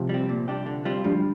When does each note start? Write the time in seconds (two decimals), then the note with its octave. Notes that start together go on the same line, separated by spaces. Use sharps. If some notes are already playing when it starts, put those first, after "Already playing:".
Already playing: C3 F3
0.09 G3 C4
0.29 A#2
0.48 G3 D4 G4
0.66 D3
0.85 G3 C4 F4
1.04 D3 F3 G3